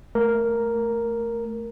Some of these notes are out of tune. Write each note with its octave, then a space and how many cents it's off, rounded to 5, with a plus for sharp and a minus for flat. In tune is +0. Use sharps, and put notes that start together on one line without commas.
A3 +0 A#4 +0